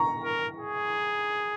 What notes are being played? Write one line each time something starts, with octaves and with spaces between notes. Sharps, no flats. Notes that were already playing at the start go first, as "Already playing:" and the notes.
Already playing: A#5 C#6
A#4
G#4